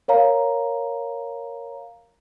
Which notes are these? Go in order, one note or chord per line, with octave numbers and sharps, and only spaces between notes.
A#4 C#5 F5 A#5